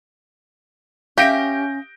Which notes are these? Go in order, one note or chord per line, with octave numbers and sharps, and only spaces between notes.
C#4 G4 E5 F5 G6 A#6 D7